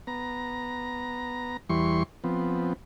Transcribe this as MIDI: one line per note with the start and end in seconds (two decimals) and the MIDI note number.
0.07 1.57 59
0.07 1.57 82
1.69 2.03 40
1.69 2.03 52
1.69 2.03 55
1.69 2.03 84
1.69 2.03 85
2.24 2.73 53
2.24 2.73 59
2.24 2.73 60